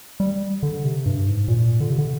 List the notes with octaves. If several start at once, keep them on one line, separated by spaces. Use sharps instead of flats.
G3
D3
C3
G2
G#2
A#2
D3
C3
D3